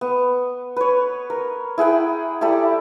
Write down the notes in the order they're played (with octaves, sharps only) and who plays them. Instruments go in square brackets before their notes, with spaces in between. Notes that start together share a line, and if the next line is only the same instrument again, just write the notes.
[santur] B3
B4 C#5
A#4
E4 G#4 F#5 G5
E4 G4 A4 D5